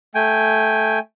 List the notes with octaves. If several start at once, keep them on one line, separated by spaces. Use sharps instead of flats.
A3 G5 G#5